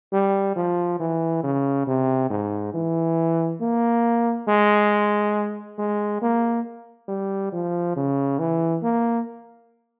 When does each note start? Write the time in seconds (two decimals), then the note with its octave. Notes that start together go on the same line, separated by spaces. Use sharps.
0.12 G3
0.56 F3
0.99 E3
1.43 C#3
1.87 C3
2.30 G#2
2.74 E3
3.61 A#3
4.48 G#3
5.78 G#3
6.21 A#3
7.08 G3
7.52 F3
7.96 C#3
8.39 E3
8.83 A#3